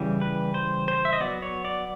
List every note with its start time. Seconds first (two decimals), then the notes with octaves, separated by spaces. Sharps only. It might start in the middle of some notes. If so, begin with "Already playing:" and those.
Already playing: C#3 E3 G3
0.21 B4
0.54 C5
0.88 C5
1.05 E5
1.13 D#5
1.20 F#3 B3 D5
1.42 C#5
1.65 D5